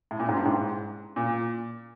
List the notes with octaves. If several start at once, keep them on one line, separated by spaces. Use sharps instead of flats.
A2
A#2
G#2
G2
G#2
A#2